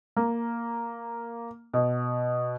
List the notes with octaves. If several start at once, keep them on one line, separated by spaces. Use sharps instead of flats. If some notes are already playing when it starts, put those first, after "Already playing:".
A#3
B2